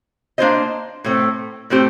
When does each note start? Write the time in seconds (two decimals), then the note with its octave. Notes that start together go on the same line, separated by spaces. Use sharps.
0.38 A#3 D4 F4 C5 D#5
1.04 A2 A3 C4
1.70 A2 A3 C4 G4